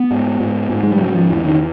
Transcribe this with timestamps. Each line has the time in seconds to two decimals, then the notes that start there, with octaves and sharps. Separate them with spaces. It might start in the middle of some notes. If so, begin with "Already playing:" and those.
Already playing: B3
0.11 G#2
0.40 G#2
0.70 G#2
0.83 G#3
0.92 G3
1.00 C#3 F#3
1.16 F3
1.29 E2 E3
1.44 D#3